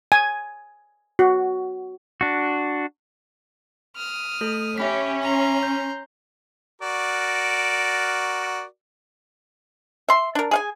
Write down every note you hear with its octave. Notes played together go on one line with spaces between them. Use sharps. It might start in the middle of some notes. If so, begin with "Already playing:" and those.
G#5
F#4
D4 F#4
D#6 F6
A3 A4
C#4 G4 E5 B5 B6
A#5 C6
G6
F#4 A#4 D5
E5 C6
D4 A#4
G#4 F5 G#5